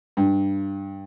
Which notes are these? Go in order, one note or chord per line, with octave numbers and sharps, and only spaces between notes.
G2